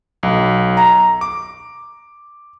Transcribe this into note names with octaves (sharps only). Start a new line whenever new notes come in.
B1
A#5
D6